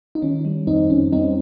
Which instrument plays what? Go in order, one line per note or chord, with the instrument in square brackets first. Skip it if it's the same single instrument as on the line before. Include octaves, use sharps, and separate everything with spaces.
[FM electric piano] D#4
D#3 C#4
G3
F2 C4 D#4
F2 C#4
G3 C4 D#4